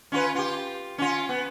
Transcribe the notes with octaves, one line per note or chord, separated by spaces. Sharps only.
C#4 F4 B4
F4 G4
C#4 F4
B3